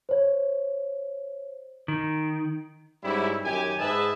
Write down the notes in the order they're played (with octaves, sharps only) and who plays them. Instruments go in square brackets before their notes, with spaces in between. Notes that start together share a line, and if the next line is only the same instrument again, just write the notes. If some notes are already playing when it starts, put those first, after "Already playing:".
[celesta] C5 C#5
[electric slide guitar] D#3
[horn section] G#2 G3 C#4 D#4 E4
F#2 D#3 G4 G#5
G#2 G#4 B4 D#5 E5 A5